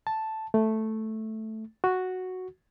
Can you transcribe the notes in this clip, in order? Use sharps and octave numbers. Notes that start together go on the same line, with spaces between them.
A5
A3
F#4